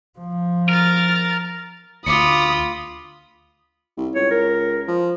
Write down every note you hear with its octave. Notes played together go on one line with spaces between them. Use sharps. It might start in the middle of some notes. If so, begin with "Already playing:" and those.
F3
A#4 F6 A6
D2 F4 B5 D6 D#6 C#7
C2
C#2 C#5
A#4
F3